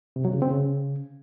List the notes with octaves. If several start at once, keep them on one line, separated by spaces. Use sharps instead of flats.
C3
F#3
C#3
C4
C#3